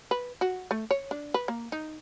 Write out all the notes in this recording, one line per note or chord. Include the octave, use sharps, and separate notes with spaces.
B4
F#4
A3
C#5
D4
B4
A#3
D#4